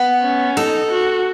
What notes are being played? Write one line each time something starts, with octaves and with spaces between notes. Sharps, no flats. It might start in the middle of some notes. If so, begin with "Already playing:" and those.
Already playing: B3
C#4
D#4 A4
F#4